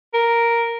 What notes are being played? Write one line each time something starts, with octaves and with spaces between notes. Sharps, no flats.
A#4